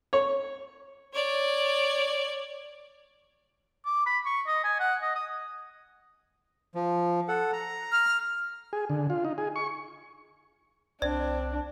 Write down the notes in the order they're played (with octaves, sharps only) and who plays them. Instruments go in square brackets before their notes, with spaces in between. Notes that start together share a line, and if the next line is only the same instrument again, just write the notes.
[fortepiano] C#5
[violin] C#5 D5
[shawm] D6
B5
C#6
D#5
G#5
F#5
D#5
D#6
[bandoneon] F3
A4 F#5
A#5
[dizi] F6
[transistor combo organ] G#4
D3
F4
D#4
G#4
C#6
[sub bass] C2 [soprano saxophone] C4 [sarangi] D4 [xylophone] D5